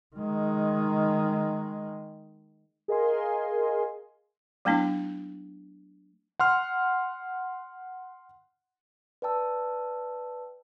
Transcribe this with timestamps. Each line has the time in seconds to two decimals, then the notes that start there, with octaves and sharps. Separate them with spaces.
0.16 D#3 G#3
2.88 G#4 A#4 D#5 F5 G#5 C6
4.65 F#3 A3 B3 D4 E4
6.40 F#5 C6 F6
9.22 B4 D5 G5 A5 E6